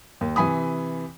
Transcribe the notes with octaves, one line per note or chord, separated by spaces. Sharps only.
D#2
C3 E3 G#5 B5 D#6